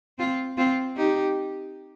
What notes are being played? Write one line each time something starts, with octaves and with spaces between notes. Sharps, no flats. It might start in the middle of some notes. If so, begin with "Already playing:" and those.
C4 F4
C4 F4
D#4 G4